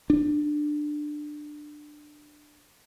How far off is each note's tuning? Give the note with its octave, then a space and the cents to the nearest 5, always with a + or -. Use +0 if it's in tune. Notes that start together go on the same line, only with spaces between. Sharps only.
D4 +20